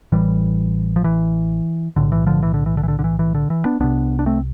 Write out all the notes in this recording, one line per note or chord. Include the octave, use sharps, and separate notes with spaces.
A1 A2 E3 G3
F3
E3
B1 A2 D3
E3
D3 F3
E3
D3
E3
D3
E3
D3
D3
E3
E3
D3
E3
B3 D4
C2 C3 B3 D4
D4
A3 C4